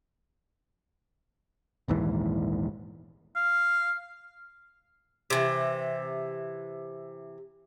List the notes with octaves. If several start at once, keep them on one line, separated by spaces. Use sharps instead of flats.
A#1 D#2 G#2 E3
F5
C3 E3